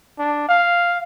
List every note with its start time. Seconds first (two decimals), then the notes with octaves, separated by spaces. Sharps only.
0.19 D4
0.49 F5